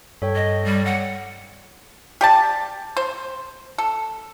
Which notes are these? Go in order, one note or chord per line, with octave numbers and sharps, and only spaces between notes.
G2 A4 C#5 G5
D#5
G3
F#5
G4 D5 A5
C5
A4